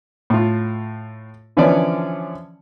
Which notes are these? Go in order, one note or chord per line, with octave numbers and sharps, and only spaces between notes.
A2 F4
D3 E3 F3 C#4 C#5 D5